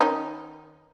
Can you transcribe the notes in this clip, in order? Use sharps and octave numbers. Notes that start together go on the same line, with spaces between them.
D#3 C#4 D#4